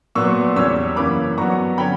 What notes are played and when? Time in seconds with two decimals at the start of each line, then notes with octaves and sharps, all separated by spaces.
0.15 A#2 F#3 B3 C#6 E6
0.56 E2 C#3 G3 C#4 C#6 E6
0.96 F#2 E3 A#3 C#4 B5 D6
1.37 G2 F#3 B3 A#5 C#6
1.78 D3 F#3 C#4 G5 B5